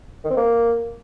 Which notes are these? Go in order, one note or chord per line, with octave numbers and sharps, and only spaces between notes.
D#3
C4
A#3